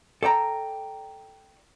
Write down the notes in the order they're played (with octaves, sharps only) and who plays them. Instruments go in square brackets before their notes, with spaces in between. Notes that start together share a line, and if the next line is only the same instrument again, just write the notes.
[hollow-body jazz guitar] A4 D5 G5 A#5